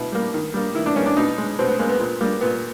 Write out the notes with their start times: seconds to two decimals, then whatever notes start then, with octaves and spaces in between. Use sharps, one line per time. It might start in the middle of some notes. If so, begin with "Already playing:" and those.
Already playing: B2 E4
0.12 G3 A#3
0.34 D#3
0.54 G3 A#3
0.75 D#3 E4
0.86 D4
0.95 G3 A#3 C#4
1.06 D4
1.17 B2 D#4
1.38 G#3
1.59 B2 C4
1.68 B3
1.79 G#3 A#3
1.89 B3
2.00 A#2
2.21 G3 A#3
2.41 A#2 B3